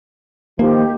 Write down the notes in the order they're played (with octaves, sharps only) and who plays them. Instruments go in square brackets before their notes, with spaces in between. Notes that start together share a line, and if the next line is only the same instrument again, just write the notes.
[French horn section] D#3 F3 [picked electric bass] A#3 [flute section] G4